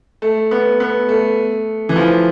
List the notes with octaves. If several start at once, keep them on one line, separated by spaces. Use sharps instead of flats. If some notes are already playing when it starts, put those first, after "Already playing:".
A3
B3
B3
A3
E3
F3